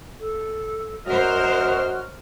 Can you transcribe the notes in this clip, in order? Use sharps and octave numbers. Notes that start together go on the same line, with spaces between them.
A4
F#2 F#4 A#4 C5 D#5 F6